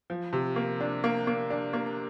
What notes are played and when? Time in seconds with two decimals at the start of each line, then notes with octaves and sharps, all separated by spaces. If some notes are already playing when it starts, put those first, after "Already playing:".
0.10 F3
0.33 C3
0.56 A#3
0.81 D4
1.04 A#3
1.27 A#3
1.50 D4
1.73 A#3